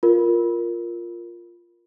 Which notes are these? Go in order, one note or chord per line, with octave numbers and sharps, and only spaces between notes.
F4 A#4